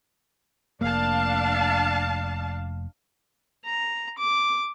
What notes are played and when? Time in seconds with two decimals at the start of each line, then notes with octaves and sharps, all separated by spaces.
0.81 F1 A#3 D4 F5 A5
3.65 A#5
4.18 D6